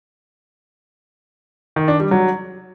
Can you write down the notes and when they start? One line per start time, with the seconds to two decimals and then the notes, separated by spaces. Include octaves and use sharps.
1.76 D#3
1.88 D4
2.00 G3
2.11 F#3